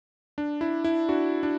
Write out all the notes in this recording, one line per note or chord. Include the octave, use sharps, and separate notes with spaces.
D4
E4
E4
D4 F#4
D4